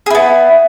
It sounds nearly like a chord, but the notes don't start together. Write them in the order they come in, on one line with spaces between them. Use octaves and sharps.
G#4 E4 B3